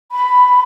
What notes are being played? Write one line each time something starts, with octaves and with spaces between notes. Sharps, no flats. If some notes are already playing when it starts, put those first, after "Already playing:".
B5